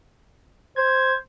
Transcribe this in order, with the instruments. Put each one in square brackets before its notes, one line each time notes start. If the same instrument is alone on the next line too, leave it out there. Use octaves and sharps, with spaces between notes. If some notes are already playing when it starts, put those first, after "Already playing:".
[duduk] C5 [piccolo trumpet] G#6